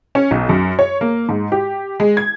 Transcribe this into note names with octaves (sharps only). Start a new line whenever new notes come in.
C#4
B1
F#2
C#5
A#3
G#2
G4
G#3
G#6